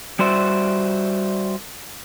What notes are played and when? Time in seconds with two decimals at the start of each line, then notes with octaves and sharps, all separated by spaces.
0.19 G3 F#4 C5 D5 E5